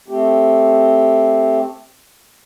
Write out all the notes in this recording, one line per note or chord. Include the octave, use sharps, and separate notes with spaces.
A3 C4 G4